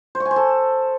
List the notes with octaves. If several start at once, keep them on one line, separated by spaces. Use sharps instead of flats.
C5
C#6
G#5
C5
A4